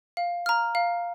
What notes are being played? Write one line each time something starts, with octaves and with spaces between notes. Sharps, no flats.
F5
A#5 F6
F5